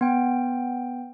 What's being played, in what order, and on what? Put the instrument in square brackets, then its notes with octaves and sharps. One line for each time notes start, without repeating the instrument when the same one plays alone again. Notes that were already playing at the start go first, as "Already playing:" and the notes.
[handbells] B3 G5